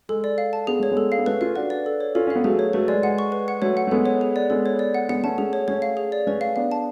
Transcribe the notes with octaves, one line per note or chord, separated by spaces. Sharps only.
G#3 A4
D5
F5
A5
B3 G#4
A3 C#5
G#3 B3
A4
F5
B3
A3 C#4 B4
C#4 F4 F5
D4 F#4 B4
D5
A4
C#5
C#4 F4 A4
C#4 F5
B3
F#3 A3 G#4
C#5
F#3 A3 B4
G#3 D5
G#3 F#5
C#6
B4
F#5
F#3 A3 C#5
F#5
A3
G#3 B3 A4
C#5
G#4
D5
G#3 B3 A4
C#5
D5
F#5
G#3 B3 F#5
A3 C#4 A5
A3 C#4 G#4
C#5
A3 C#4 C#5
F5
G#4
D5
A3 C#4 B4
F5
B3 D4 F5
A5